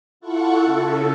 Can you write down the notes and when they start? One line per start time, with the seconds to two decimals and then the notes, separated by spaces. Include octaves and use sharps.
0.20 E4 F4 A4 F#5 C#6
0.59 C#3 A4